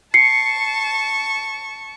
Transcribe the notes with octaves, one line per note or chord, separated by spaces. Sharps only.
A5 C#6 C7 C#7